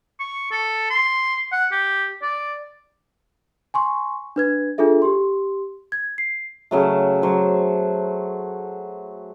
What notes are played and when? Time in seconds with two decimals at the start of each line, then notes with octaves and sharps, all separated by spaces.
0.20 C#6
0.51 A4
0.91 C6
1.52 F#5
1.72 G4
2.22 D5
3.74 G#5 C6 C#6
4.36 D4 B4 G#6
4.78 D4 F4 G#4 A4 E5
5.02 G4 C6
5.92 G#6
6.18 C7
6.71 C#3 F#3 A3
7.22 F#3 C5